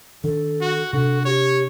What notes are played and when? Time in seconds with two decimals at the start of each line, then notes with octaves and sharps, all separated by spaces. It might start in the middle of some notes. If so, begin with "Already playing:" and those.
0.24 D#3 D4 A4
0.61 F#4
0.93 C3 D4 F#4 A4
1.25 G4 C#5